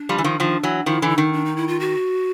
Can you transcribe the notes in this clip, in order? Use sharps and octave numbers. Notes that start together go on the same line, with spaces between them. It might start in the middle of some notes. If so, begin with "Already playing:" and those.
Already playing: D4
F3 G3
E3
D#3 F3
D#3 F3
E3 F#3
D#3 F3 E4
D3 E3
D#4
D#3
D4
D#4
E4
F4
F#4